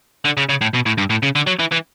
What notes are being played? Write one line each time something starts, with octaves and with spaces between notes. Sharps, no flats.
D3
C#3
C#3
A2
B2
A2
G2
A2
C#3
D3
F#3
E3
E3